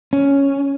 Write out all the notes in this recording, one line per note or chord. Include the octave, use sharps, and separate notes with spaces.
C#4